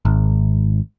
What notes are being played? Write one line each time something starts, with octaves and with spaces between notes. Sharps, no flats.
G#1